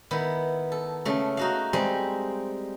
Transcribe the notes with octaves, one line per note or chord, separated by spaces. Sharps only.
D#3 B3 E4
A4
C#3 A3
D#4 F#4 F5
G3 G#3 C4 G#4